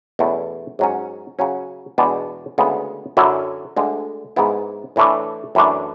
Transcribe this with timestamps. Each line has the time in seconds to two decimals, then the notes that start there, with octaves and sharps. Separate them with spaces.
0.19 E2 B2 A3 C#4 E4
0.79 G#2 F#3 C#4
1.39 C#3 F#3 C#4
1.98 E2 B2 G#3 B3 D4
2.58 D2 C#3 G#3 B3 E4
3.17 F#2 D3 F#3 C#4 E4
3.77 D2 D3 G#3
4.36 G#2 G#3 B3 E4
4.96 A2 E3 A3 D4
5.55 F#2 E3 A3 D4